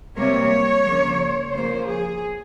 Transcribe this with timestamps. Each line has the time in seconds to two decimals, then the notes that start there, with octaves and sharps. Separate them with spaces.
0.17 C3 G3 A#3 C#5
0.85 C#3 F3 A#3
1.53 C#3 F3 A#3 C5
1.87 G#4